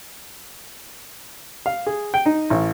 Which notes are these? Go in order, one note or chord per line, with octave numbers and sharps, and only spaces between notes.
F5
G#4
G5
D#4
A1